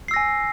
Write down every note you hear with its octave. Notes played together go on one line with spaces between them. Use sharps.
G#5 E6 A#6 C7